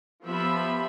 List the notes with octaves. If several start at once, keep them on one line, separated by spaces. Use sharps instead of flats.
F3 B3 G4 E5 B5